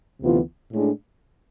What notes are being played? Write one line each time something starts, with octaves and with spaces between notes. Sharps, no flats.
D2 C3 E3 B3 F4
A2 G#3 D4